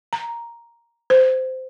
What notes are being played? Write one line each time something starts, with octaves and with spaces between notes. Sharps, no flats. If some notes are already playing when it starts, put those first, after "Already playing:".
A#5
C5